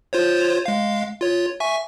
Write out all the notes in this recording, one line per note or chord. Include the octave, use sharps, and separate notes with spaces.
F4 C5 C#5
G#3 F5
F4 C#5
E5 G#5 C#6